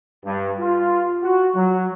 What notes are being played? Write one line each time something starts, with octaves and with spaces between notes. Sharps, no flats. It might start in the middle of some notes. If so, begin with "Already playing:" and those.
G2
F4
F#4
F#3